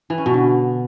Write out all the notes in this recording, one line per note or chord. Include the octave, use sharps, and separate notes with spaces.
E3
C#4
B2
D3